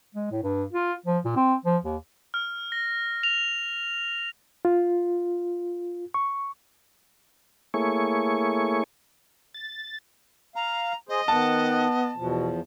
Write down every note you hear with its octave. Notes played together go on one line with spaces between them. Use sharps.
G#3
A2
G2
F4
F3
A#2
C4
F3
D#2
F6
A#6
F7
F4
C#6
A3 A#3 E4 G#4 C#5 C#6
A6
F5 A#5
G#4 C5 D#5
D#3 B3 F#5 A5
E2 B2 F3